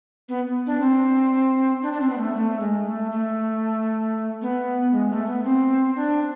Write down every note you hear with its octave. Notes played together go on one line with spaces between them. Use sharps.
B3
D4
C4
D4
D4
C4
B3
A3
A3
G#3
A3
A3
B3
G#3
A3
B3
C4
D4